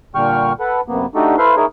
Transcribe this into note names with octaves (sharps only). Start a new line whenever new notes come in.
A#2 D3 G3 G5 C#6 F6
A4 B4 F#5
F#2 C3 A#3 B3
A3 D4 D#4 F#4 G4 A4
E4 A4 B4 C5 F5 C6
A#3 D#4 E4 G#4 A#4 C#5